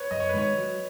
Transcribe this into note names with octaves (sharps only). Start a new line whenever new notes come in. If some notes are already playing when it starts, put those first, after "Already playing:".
Already playing: B4 C#5
F#2 D#5
C#5
B4
D#3 G#3 C#5
F#3